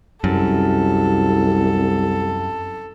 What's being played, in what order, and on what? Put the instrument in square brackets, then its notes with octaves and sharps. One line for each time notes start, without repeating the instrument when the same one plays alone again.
[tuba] C2 [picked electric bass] F#2 [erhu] A4